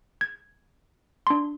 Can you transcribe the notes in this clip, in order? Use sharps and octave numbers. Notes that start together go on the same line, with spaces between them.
G#6
D4 C6